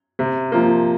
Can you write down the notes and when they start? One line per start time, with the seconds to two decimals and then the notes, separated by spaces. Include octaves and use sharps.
0.19 C3
0.52 F3 A#3